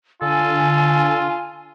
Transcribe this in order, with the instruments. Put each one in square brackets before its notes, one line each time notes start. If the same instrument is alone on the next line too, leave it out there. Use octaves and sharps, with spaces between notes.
[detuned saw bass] D3 [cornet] F4 [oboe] A4 [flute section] G#5